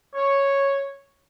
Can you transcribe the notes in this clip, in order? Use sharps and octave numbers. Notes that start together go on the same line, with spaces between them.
C#5